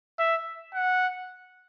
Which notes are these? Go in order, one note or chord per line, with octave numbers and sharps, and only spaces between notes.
E5
F#5